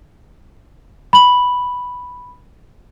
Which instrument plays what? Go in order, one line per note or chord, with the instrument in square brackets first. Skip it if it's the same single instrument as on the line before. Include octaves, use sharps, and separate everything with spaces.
[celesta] B5 F#7